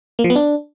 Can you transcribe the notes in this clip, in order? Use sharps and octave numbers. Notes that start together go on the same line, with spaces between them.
A#3
F3
B3
D4